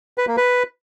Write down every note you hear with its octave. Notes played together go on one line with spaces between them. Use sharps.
B4
A#3
B4